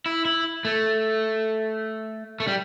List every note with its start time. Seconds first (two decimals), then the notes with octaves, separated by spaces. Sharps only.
0.06 E4
0.25 E4
0.65 A3
2.40 A3
2.47 G3